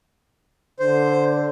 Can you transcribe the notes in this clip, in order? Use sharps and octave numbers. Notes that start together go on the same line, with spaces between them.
D3 C5